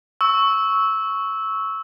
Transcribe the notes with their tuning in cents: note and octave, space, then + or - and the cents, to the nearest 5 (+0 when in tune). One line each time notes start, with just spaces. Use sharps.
C#6 +0 E6 -10